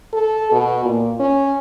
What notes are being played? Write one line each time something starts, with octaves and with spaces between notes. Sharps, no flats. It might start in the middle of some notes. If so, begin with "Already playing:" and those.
A4
B2
A#2
C#4